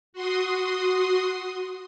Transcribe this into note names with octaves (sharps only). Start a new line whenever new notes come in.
F#4 C6 D#6